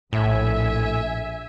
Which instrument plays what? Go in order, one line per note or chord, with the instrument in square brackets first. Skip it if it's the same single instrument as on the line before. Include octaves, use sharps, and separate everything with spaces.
[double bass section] A#1 [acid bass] A2 [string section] E5 G#5